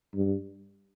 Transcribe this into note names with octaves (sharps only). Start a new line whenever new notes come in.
G2